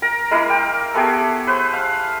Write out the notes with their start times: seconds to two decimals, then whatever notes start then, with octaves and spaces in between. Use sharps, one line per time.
0.02 A#4 A#5
0.31 G#3 A#3 E4 A#4
0.50 G5
0.94 A3 B3 G4 G#4
1.47 B4 C5
1.74 F5